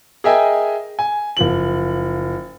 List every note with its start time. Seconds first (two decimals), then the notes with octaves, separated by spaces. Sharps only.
0.24 G#4 A#4 D#5 E5 G5 G#5
0.99 G#5
1.37 F#1 F3 F#7